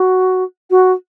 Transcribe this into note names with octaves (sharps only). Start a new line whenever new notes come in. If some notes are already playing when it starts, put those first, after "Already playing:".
Already playing: F#4
F#4